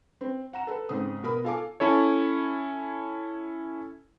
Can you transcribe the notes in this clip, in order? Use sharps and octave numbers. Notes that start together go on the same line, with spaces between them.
C4
F#5 A#5 E7
A4 B4
G#2 C#3 C4 D#6
B2 B3 A#4 B5 D#6
F4 A4 F5 G#5 D6
C#4 E4 A4 C#5